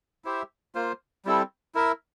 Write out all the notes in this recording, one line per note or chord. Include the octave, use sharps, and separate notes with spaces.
E4 G4 C5 E5
A#3 F4 C5
G3 C4 E4 A4
E4 A#4 E5